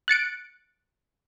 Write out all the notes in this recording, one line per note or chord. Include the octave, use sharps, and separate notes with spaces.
F#6 A6 C#7 D7